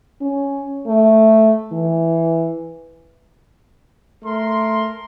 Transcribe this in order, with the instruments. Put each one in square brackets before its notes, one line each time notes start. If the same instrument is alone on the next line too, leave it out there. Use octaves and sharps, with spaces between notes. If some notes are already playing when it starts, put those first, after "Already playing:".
[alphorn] C#4
A3
E3
[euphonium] A3 [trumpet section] A#4 C6